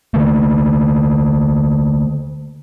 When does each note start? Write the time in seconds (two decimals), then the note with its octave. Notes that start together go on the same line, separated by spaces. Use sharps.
0.14 D3 A3 A#3